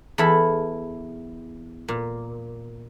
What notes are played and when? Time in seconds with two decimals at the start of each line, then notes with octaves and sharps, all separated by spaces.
0.18 E2 E4 A4 B5
1.88 A#2